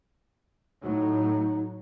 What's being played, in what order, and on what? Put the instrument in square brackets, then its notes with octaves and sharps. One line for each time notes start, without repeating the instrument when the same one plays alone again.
[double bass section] A2 F#3 [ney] D#4